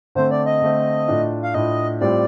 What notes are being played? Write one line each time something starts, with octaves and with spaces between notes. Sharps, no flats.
D3 A3 C4 C5
D5
D#5
D3 A3 C4
A2 A3 D4 F4
F5
A2 A3 D4 F4 D#5
A2 G3 C4 F4 D5